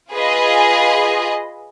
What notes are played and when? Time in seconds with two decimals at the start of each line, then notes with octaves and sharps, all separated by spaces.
0.11 F4 G#4 B4 D#5